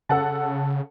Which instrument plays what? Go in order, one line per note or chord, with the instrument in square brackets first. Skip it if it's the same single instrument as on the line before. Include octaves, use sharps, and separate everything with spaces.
[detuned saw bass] C#3 [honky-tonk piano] A4 F#5 A5